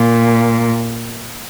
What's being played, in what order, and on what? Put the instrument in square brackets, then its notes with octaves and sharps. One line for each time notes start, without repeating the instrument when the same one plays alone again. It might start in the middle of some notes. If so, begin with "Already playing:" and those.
Already playing: [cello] A#2